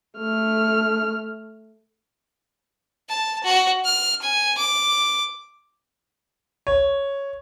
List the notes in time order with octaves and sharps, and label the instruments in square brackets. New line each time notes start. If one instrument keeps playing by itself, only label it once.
[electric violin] A3 F6
[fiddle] A5
F#4
F6
G#5
D6
[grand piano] C#5